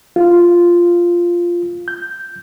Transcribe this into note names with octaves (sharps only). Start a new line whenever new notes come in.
F4
G6